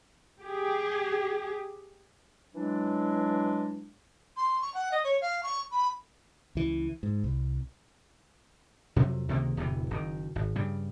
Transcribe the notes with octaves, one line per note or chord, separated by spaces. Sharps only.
G4 G#4
E3 F#3 G#3 D4
C6
C#6
F#5
D#5
C#5
F5
C#6
B5
C#2 E3
G#2
C2
F2 C3 F#3
C#2 C3 D#3 A#3
D1 E2 C3 E3
F#1 C3 D#3
G#1
G2 C#3 G3